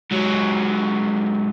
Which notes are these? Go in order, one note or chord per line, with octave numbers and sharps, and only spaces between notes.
G#2 F#3